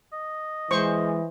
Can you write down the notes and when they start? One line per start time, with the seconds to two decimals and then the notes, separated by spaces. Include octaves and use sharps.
0.13 D#5
0.71 E3 G#3 C5 C#6